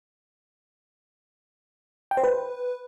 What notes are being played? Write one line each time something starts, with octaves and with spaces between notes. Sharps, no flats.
G5
C5
B4